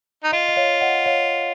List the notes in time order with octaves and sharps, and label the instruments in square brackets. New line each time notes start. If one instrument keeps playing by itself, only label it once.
[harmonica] D#4
[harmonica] F4 [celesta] D#5
[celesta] D#5
C#5 F5
D#5 F#5
C#5 F5